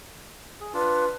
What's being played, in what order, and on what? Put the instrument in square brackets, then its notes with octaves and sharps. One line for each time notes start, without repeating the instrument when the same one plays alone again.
[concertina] G#4
[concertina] D4 F4 [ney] B4